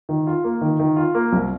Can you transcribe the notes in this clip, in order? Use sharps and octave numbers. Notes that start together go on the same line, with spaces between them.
D#3
F4
A#3
D#3
D#3
F4
A#3
C2